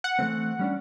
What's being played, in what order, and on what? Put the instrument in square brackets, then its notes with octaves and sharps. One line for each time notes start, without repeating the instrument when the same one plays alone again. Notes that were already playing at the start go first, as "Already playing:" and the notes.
[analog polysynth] F#5
[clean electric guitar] E3 A3 C4
G3 C#4 D4